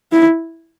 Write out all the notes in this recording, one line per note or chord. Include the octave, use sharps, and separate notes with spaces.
E4